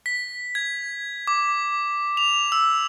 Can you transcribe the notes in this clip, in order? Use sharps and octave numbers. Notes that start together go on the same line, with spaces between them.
B6
G#6
D6
F7
E6